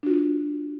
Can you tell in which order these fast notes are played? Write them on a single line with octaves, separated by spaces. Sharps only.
D4 F#4 F4